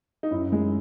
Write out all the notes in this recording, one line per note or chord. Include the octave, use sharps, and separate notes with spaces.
D#4
F#2 E4
G#3